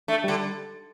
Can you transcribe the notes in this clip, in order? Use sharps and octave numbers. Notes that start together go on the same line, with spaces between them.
A3 D4
D3 G3